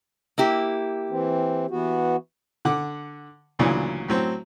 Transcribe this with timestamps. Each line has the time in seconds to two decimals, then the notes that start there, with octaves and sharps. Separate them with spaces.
0.38 A#3 E4 G4
1.10 E3 C4
1.71 E3 B3 F#4
2.65 D3 F#5 D6
3.59 D2 A#2 C#3 E3 F#3 D4
4.09 A2 F#3 C4